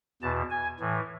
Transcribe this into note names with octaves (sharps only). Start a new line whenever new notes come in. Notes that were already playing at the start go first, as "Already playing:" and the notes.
E2 B2 A5
G#5
A2 E3